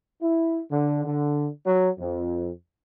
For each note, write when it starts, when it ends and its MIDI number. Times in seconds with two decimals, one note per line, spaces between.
0.21 0.60 64
0.70 1.03 50
1.04 1.48 50
1.66 1.89 54
1.99 2.49 41